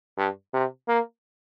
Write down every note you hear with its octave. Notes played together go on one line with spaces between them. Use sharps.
G2
C3
A#3